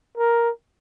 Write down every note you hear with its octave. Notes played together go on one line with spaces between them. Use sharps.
A#4